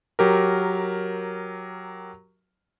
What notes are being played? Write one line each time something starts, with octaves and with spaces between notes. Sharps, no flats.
F#3 G4 A#4